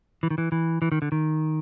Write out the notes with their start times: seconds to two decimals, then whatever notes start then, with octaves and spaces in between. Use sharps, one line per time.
0.23 E3
0.31 D#3
0.38 E3
0.52 E3
0.82 E3
0.92 D#3
1.02 D3
1.12 D#3